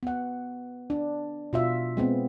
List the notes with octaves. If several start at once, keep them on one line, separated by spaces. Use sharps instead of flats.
B3 F#5
D4
B2 F4 E5
G#3 B3 C4